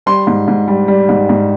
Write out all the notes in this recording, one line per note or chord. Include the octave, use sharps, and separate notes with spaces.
G3 C6
G#2
G#2
G3
G3
G#2
G#2